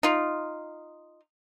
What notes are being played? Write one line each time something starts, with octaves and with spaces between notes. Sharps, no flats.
D#4 F4